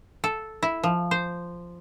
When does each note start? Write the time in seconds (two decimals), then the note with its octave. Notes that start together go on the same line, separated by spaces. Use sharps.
0.24 A4
0.63 E4
0.83 F3
1.11 C5